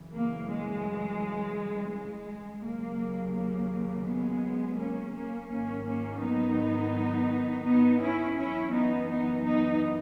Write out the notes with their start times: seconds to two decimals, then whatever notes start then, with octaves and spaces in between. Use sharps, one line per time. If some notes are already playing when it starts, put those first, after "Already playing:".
Already playing: F#2 C#3 E3
0.12 A#3
0.49 G#3
1.91 G#3
2.63 D#2 C#3 F#3 A#3
3.34 A#3
4.06 G#3 B3
4.78 A#3 C#4
5.14 A#3 C#4
5.50 G#2 D#3 F#3 A#3 C#4
5.86 A#3 C#4
6.21 B3 D#4
7.65 B3 D#4
8.00 C#4 E4
8.36 F#2 E3 C#4 E4
8.72 B3 D#4
9.09 B3 D#4
9.44 B3 D#4